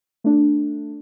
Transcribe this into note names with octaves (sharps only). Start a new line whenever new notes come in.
A3 D4